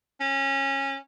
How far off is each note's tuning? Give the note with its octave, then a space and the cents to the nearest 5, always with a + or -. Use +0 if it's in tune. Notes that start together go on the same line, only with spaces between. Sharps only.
C#4 -20